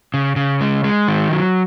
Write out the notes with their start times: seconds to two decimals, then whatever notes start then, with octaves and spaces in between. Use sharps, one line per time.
0.14 C#3
0.36 C#3
0.61 G#3
0.84 G#3
1.08 D#3
1.31 F#3